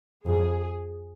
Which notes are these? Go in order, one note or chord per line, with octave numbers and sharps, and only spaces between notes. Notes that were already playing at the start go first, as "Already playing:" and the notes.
F2 G#4